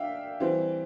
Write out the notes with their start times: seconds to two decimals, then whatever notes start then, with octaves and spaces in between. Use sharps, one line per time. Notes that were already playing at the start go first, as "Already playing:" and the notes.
Already playing: D4 E5 F5 G5
0.40 E3 G3 C4